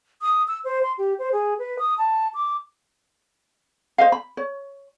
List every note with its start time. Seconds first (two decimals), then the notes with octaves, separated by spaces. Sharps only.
0.22 D#6
0.48 E6
0.64 C5
0.83 C6
0.98 G4
1.19 C5
1.32 G#4
1.59 B4
1.79 D#6
1.98 A5
2.34 D6
3.98 C5 D#5 F5
4.12 B5
4.37 C#5